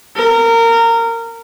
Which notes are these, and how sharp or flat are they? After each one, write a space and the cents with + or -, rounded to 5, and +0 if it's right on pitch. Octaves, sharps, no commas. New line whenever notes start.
A#4 -20